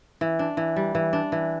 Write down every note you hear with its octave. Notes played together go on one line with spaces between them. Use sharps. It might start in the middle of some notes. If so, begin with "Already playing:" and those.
E3
D4
E3
G3
E3
D4
E3